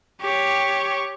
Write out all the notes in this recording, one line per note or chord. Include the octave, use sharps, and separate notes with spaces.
G4 C#5